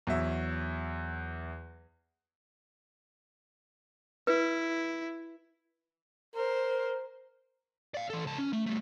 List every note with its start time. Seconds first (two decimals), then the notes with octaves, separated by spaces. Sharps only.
0.07 E2 F#3 E5
4.27 E4 B4
6.36 A#4 C5
7.94 D5 F5
8.10 E3 A4
8.26 C#2 A5
8.38 C#4
8.53 A3
8.67 G3 A3